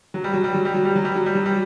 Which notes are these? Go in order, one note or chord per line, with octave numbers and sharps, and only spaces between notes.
F#3
G3
F#3
G3
F#3
G3
F#3
G3
F#3
G3
F#3
G3
F#3
G3